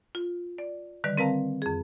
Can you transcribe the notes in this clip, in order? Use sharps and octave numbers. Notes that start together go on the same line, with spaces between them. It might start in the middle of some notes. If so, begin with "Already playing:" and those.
F4
D5
D3 D#3 G3 B4 D5
C4 A#4 B4 F5 A5 A#5
F2 G#4